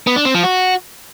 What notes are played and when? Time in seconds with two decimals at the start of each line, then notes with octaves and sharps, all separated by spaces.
0.07 B3
0.16 D4
0.25 C4
0.34 F3
0.43 F#4